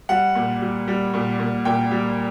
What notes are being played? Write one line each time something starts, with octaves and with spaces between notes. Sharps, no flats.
G3 F#5
A#2
G3
G3
A#2
A#2
A#2 G5
G3